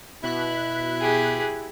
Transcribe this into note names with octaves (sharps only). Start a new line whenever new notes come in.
B2 E4 F#6 B6
G4 G#4